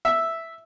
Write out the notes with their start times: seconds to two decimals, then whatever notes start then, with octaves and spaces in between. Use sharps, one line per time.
0.05 E5